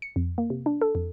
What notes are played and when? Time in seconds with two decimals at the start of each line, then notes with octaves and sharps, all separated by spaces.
0.02 C#7
0.16 F2
0.38 A#3
0.50 C3
0.66 D4
0.82 A4
0.95 F2